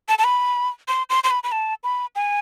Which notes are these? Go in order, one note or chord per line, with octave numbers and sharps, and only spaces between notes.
A5
A5
B5
C6
C6
C6
B5
B5
A5
B5
G#5